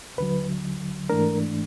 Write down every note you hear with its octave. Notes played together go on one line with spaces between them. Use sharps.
D#2 D3 F#3 B4
G#2 E3 A3 D4 A#4